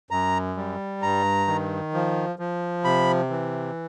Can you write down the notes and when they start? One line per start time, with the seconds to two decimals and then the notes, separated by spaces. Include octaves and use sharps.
0.11 F#2 A#5
0.57 G3
1.02 G2 A#5
1.48 D#3
1.94 F3
2.39 F3
2.84 C3 B5
3.30 E3